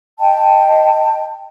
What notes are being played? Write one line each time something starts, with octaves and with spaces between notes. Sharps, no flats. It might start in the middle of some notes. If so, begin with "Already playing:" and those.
D#5 G5 A5